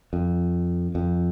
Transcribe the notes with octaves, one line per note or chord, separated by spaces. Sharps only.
F2
F2